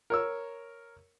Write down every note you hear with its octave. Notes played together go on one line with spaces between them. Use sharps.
A#4 C#5 E6